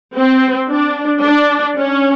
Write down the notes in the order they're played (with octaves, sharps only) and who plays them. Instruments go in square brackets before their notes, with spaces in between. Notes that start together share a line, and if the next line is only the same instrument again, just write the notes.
[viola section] C4
D4
D4
C#4